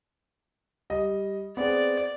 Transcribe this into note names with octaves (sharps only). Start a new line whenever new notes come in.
G3 D#5
B3 C4 G#4 D5